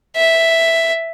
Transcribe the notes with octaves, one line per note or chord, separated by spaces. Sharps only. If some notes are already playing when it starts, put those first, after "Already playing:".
E5